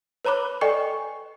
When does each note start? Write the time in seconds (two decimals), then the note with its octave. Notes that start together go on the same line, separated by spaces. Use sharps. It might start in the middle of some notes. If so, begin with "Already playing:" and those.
0.25 B4 C#5 A#5 B5 D6 F#6
0.61 A4 D5 D#5 G5 G#5 C#6